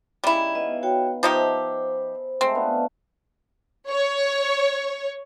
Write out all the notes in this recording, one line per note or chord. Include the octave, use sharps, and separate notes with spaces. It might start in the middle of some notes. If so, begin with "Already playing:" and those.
C#3 G3 D#4 E4
B3 D#5 F5
F#4 C#5 G5
F3 D#4 G4 C5 D#5 E5 A5
G#3 A3 C4
B3 D4 F4
C#5